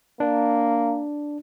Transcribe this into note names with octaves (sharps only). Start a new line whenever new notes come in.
A#3 D4